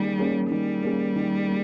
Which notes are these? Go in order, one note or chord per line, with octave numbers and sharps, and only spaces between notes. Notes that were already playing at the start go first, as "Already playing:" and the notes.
Already playing: D#3 G3 A#3 C#4 G#4
A#3 C#4 G#4
D#3 G3
A#3 C#4 G#4
D#3
A#3